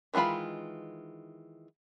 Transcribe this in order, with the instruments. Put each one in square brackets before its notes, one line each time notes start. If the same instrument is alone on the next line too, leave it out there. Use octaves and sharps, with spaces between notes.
[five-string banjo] D#3 E3 G#3 F4 B5